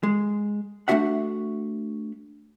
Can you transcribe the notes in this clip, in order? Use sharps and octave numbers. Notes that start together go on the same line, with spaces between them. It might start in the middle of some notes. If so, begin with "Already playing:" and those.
G#3
A3 C4 D4 F#4 E5 F#5